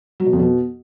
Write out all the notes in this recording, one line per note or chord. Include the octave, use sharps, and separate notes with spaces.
F#3
B2
F2
B2